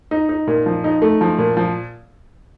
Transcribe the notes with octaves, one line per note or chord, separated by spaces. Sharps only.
D#4
D#4
A#2
F3
D#4
A3
F3
A#2
F3